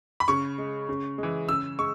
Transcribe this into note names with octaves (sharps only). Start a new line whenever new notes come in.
B5
C#3 C#6
G#3
C#3
E3 G#3
C#3 E6
G#3 C#6